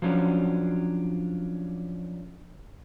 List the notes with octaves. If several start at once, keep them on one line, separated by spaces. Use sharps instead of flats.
F3 F#3 C#4 D4